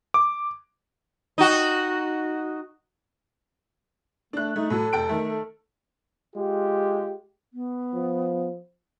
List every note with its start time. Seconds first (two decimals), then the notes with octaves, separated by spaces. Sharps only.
0.14 D6
1.38 D#4 F#4
4.33 A3 D4 F#6
4.56 A3 D#4
4.70 A2 F#3 A4
4.93 F1 G5 D7
5.09 D#3 A3
5.28 A4
6.34 G#3 F4 G4
7.53 B3
7.95 F3